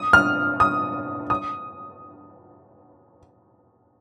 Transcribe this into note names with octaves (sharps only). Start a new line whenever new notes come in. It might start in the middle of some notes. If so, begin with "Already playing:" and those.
Already playing: D#6
F6
D#6
D#6